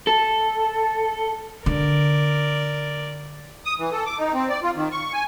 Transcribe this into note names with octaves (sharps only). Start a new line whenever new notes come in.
A4
D3 A#4 D5
D#6
E3
A4
D6
D#4
C4
D5
F4
D#3
C#6
G#5